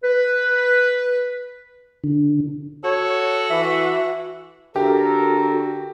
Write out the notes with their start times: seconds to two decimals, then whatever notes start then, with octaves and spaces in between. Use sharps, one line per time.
0.03 B4
2.04 D3
2.84 F#4 A4 C#5
3.50 E3 E5
4.76 D3 F#4 G4 A4 A#4